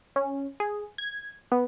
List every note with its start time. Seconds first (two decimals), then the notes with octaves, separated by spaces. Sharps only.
0.16 C#4
0.60 G#4
0.98 G#6
1.52 B3